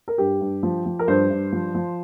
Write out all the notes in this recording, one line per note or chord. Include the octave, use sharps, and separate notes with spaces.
A#4
G2 G4
G2
F3
F3
A#4
G2 C5
G2
F3
F3